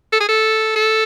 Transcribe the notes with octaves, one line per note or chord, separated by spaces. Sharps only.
A4
G#4
A4
A4